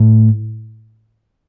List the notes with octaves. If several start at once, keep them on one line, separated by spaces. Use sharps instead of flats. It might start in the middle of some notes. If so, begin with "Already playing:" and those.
Already playing: A2